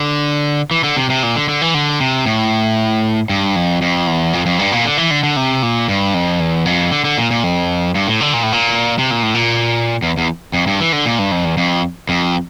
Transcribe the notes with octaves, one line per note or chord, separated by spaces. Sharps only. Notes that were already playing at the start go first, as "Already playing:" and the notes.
Already playing: D3
E3
D3
C3
C3
A#2
D3
D3
E3
D3
C3
A2
G2
F2
F2
E2
F2
F2
G2
A#2
D3
E3
D3
D3
C3
A#2
G2
F2
E2
F2
D3
D3
A#2
A#2
F2
G2
A2
D3
A#2
A2
A#2
C3
A#2
A2
A#2
E2
E2
F2
G2
E3
D3
A#2
G2
F2
E2
F2
F2